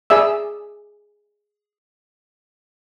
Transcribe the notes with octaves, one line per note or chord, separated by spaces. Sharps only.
G#4 D5 E5 E6